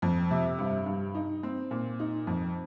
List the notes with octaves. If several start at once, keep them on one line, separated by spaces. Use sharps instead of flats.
F2
C3
G2
G2
D#4
C4
A#2
D#4
F2